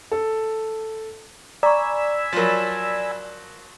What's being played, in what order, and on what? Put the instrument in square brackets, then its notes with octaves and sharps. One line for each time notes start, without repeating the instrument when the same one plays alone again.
[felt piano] A4
[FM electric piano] D5 [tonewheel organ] G#5 B5 E6 [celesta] A#5 C#6
[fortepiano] F3 F#3 [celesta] A#4 A6